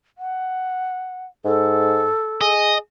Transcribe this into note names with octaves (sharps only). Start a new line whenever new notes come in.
F#5
G#2 A4
G#4 D#5